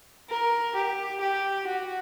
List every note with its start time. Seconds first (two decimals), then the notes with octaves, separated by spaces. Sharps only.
0.29 A#4
0.75 G4
1.20 G4
1.66 F#4